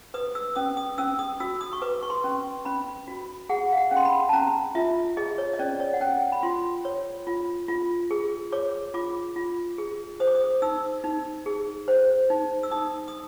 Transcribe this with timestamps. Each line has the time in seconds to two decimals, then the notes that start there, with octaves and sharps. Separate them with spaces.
0.14 B4 D#6
0.35 E6
0.56 C#4 D#6
0.77 D#6
0.98 C#4 E6
1.19 D#6
1.40 F#4 E6
1.61 D#6
1.73 C#6
1.82 B4 D6
2.03 C#6
2.10 C6
2.24 C#4
2.65 C#4 B5
3.08 F#4
3.49 G#4 F#5
3.73 F5
3.77 F#5
3.91 C#4
3.97 C6
4.05 B5
4.29 A5
4.33 C#4 A#5
4.75 F4 E5
5.17 G#4 D#5
5.38 C#5
5.53 D#5
5.59 C#4 D5
5.80 C#5
5.93 F#5
6.01 C#4 G5
6.32 B5
6.43 F4 C6
6.85 C#5
7.27 F4
7.68 F4
8.11 G#4
8.52 C#5 D6
8.94 F4 D6
9.36 F4
9.78 G#4
10.20 C5 D#6
10.27 D6
10.35 D#6
10.62 D#4 E6
11.04 D#4
11.46 G#4
11.88 C5
12.30 D#4
12.63 E6
12.71 D#4 D#6
13.08 D#6